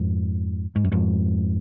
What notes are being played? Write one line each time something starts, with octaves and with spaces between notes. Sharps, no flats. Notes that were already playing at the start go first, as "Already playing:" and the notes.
Already playing: F2 G#2
G#2
F#2
F2 G#2